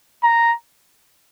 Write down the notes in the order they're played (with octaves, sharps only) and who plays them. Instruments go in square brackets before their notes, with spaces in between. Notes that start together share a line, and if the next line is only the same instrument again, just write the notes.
[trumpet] A#5